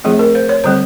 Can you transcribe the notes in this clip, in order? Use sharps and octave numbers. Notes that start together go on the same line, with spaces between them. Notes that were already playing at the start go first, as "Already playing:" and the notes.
F3 A3 C4 G#4
A#4
C5
C#5
D3 G3 C4 C5